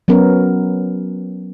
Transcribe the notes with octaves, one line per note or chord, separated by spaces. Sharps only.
F#3 B3 C#4 A#4